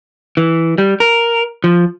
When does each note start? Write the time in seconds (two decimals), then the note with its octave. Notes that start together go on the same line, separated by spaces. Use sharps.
0.37 E3
0.78 G3
1.00 A#4
1.64 F3